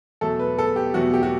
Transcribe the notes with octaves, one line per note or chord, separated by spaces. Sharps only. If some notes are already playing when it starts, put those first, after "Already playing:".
E2 B2 F#3 A3 A4
B4
A4
G4
E2 B2 F#3 A3 F#4
G4
F#4